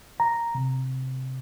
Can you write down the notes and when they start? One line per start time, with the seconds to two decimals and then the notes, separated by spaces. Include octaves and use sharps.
0.20 A#5
0.55 C3